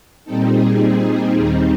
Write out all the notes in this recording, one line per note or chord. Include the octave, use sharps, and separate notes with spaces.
A#2 G3 C4 D#4 A4
G#4
G#4
D#2 D#3 G3 C4 D#4 G#4